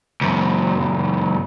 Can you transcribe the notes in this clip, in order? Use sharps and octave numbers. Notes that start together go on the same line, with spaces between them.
C#2 F#2